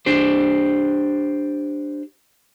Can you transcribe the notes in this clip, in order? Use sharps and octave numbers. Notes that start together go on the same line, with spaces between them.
D4 G4 C5